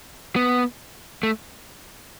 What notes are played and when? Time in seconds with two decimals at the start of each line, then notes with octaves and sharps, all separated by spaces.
0.36 B3
1.23 A3